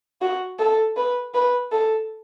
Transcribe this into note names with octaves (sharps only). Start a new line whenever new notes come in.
F#4
A4
B4
B4
A4